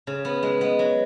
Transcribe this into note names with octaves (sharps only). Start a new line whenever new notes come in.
C#3
B3
G#3
B3
F#3